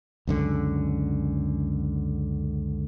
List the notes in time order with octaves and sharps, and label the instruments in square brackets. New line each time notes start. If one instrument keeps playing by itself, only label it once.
[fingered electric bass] C#2 F#2 D3